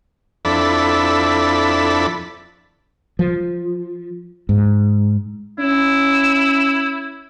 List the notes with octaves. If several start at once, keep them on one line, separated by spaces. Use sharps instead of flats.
F2 D4 E4 A4 B5
F3
G#2
C#4 E4